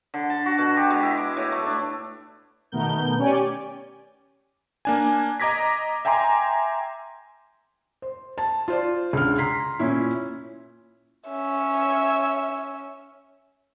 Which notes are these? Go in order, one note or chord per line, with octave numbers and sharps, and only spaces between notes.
D3
A5
F#4
B2
G4
G#3
E4
D6
A2
A3
D4
B2 D#3 A3 B3 A#4 G6
C#4 G4 C#5 D5 G#5
A#3 D4 G#5
D#5 A#5 D6 G#6 A#6 B6
E5 G5 G#5 A#5 C6 D6
C5
A5
F4 C5 D5
C#2 D3 F6
A#5 C6 B6 C7
A#2 C#4 E4
C#4 E5